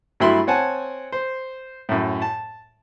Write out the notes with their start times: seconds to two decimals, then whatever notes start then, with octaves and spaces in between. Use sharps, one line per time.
0.20 G2 F#3 A3 E4 B5 C6
0.47 C4 C#5 F#5 G#5 A5
1.12 C5
1.89 F#2 A2
2.22 A5